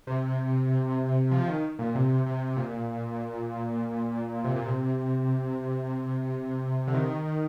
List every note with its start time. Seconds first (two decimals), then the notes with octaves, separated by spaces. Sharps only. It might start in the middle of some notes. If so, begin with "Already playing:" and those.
0.07 C3
1.31 F3
1.47 D#3
1.79 A#2
1.95 C3
2.26 C3
2.57 A#2
4.44 C3
4.56 A#2
4.66 C3
6.87 D3
6.94 D#3